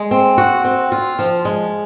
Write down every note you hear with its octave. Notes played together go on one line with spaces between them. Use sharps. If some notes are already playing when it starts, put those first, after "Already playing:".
Already playing: G#3
C4
F#4
C4
F4
F3
G#3